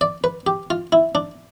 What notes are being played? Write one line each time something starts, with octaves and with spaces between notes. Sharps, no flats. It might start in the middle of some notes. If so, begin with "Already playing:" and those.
D5
B4
G4
F4
E4
D4